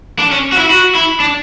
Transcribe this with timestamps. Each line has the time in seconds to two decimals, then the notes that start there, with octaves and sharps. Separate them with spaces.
0.19 D4
0.32 C#4
0.52 F#4
0.57 E4
0.70 F#4
0.95 E4
1.20 D4